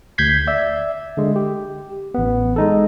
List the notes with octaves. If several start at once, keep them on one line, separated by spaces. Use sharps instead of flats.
D2 G6 G#6 B6 C7
D5 E5
D3 G#3
G4
A1 B3
G#3 D#4 A4